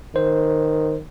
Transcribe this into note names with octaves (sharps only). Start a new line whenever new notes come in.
D#3 C5